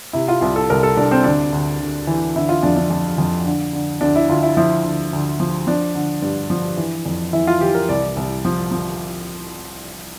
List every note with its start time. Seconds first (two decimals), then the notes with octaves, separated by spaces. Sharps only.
0.13 C3 E4
0.28 F4
0.41 C2 F4
0.56 A4
0.70 C2 A#4
0.83 A4
0.97 C2 D4
1.11 C4
1.24 D2 D4
1.53 D2
1.80 D2
2.07 E3
2.36 D3 E4
2.49 F4
2.63 F2 D4
2.76 D4
2.90 F2
3.18 F2
3.46 D3
3.73 D3
4.01 D2 D4
4.16 E4
4.29 D2 F4
4.43 E4
4.57 F3 E4
4.85 D2
5.13 D2
5.40 F3
5.67 F3 D4
5.95 D3
6.22 G2
6.50 F3
6.78 E3
7.06 F2
7.33 E3 E4
7.47 F4
7.61 E3 G4
7.75 A#4
7.89 C2 D5
8.17 C2
8.45 F3
8.71 F3